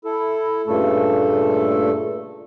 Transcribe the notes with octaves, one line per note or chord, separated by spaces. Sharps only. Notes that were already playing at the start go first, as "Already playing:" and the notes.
E4 A4
G2 A#2 C#3 A3 A4